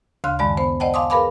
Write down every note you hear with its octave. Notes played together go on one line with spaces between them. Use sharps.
D2 C#3 F5 C6 F6 F#6
F#2 D#3 G#3 D5 A5 B5
B3 C5
C5 D5 D#5 F#5 G5 A5
F5 G#5 A5 C6 D6 D#6
G#4 A#4 B4 F5 B5 D6